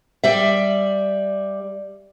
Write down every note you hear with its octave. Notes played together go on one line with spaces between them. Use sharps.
G3 D5 E5